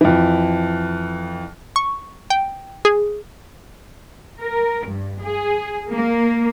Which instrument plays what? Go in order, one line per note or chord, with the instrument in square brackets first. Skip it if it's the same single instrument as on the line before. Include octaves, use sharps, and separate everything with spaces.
[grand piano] F2 E3
[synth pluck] C#6
G5
G#4
[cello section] A#4
G2
G#4
A#3